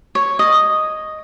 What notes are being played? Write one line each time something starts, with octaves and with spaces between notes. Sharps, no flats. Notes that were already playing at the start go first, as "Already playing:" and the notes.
C#5
D#5